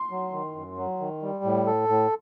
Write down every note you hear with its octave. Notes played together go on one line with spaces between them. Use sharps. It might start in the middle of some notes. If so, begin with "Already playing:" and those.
Already playing: C6
F#3
D#3
F#2
F#3
D#3
G3
A2
A4
A2